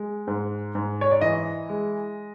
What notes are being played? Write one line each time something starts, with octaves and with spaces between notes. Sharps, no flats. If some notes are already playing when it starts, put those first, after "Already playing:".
Already playing: G#3
G#2
G#2
C#5
D5
E3 D#5
G#3